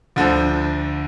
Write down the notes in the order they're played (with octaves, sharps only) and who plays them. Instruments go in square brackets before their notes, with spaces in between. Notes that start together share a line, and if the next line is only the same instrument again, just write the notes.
[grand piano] D2 D3 F3